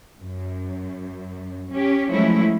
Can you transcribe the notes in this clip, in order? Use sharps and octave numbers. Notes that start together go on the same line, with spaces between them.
F#2
C#4 G4
F3 F#3 G#3 A3 C#4 E4